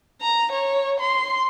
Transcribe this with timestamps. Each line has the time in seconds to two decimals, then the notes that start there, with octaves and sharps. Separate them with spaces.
0.21 A#5
0.52 C#5
1.00 C6